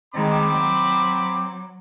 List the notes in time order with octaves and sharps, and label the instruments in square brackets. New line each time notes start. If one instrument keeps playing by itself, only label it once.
[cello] D#3 G#3 [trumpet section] C4 B5 D6
[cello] F#3